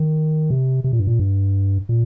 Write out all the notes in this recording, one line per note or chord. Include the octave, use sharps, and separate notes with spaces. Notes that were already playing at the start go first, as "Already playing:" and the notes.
Already playing: D#3
C3
C3
A#2
G2
A#2
G2
A#2